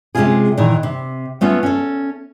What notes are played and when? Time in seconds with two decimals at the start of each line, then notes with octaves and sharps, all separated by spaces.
0.15 C3 G#3 A3 C#4 F4 G#4
0.58 A#2 D#3 E3
0.83 C3
1.41 A3 B3 C#4 F4
1.63 C#4 A4